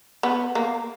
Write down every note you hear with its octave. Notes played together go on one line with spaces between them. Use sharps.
B3
A#3